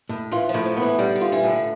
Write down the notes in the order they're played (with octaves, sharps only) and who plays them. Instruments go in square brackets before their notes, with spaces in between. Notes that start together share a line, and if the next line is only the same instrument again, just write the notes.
[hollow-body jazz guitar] A2
[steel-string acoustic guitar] E3 [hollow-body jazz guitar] F4
[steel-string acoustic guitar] F3
[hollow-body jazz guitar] A2
[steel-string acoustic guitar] F3
[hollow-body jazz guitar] B3
[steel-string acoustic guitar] E3
[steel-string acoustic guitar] D3 [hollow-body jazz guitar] G3
[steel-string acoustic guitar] D3
[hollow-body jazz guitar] F4
[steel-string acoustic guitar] E3
[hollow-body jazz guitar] A2
[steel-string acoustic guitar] D3